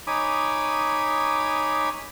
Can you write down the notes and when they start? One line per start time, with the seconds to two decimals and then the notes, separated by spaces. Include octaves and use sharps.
0.07 D#4 C#5 G#5 B5 D6 D#6